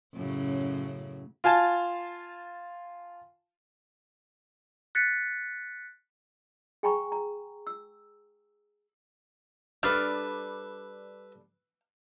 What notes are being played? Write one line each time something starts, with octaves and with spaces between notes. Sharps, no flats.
F#2 A2 C#3
F4 F5 G#5 A5
F#6 A6 B6 C#7
G#4 G5 G#5 A#5 B5 C#6
A#5
E6
G3 D4 A4 B4 E5 F6